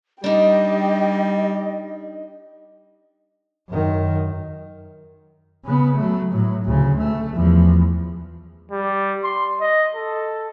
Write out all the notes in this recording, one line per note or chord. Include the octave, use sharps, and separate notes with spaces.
G3 D4 D#4 G4 D#5
F#2 D#3
C#3 B3
F#3 A3
A2 F#3
D2 C#3
A3
E2 F3
G3
C6
D#5
A4